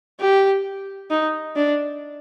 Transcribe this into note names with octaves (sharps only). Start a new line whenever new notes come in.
G4
D#4
D4